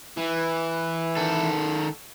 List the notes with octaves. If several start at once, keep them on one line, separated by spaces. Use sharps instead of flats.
E3
D#3 A4